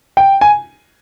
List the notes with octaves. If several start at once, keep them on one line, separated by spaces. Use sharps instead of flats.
G5
G#5